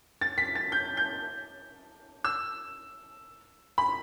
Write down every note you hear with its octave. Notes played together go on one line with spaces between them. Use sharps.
A6
B6
A6
G6
G6
E6
B5